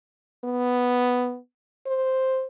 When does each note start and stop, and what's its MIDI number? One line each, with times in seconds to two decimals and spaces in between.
0.44 1.38 59
1.87 2.47 72